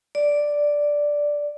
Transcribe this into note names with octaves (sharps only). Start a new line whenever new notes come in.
D5